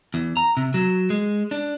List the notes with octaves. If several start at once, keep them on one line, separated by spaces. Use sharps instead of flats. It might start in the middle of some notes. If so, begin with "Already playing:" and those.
E2
A#5
C3
F#3
G#3
D4